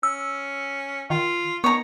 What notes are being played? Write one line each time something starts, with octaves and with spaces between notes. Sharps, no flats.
C#4 E6
D#3 F4
D#3 B3 C#5 A#5